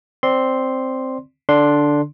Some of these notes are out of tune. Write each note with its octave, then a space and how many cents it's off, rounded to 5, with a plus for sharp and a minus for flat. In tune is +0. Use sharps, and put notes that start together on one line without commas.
C4 +0 D5 -5 C6 +0
D3 +0 D4 -5 C6 +0